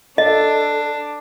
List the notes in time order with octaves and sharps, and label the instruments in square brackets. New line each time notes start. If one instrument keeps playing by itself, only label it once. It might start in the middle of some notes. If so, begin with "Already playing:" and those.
[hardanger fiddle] D4 [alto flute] A4 [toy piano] D#5